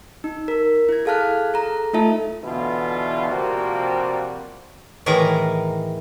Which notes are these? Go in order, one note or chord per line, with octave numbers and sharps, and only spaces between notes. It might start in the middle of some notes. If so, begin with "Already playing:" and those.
D#4
A#4
E4 G#6
G#4 A4 F5 A5 F6 F#6
G#4 A4 A#5
A3 D#4 F4 A4 E5 A5
B2 D3 E3 B3 E4 F4
C3 F3 G3 A#3 F4 F#4
A2 D#3 E3 G#4 A#4 A#5